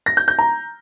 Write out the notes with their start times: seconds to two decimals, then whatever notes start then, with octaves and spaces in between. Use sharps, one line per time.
0.06 A#6
0.17 G6
0.28 G6
0.39 A#5